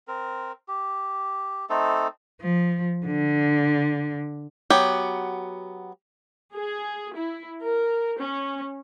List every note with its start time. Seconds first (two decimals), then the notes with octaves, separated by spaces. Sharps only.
0.08 C4 A#4
0.68 G4
1.70 A3 C4 D#4 A4
2.41 F3
3.06 D3
4.70 F#3 B3 G4
6.54 G#4
7.16 E4
7.63 A#4
8.19 C#4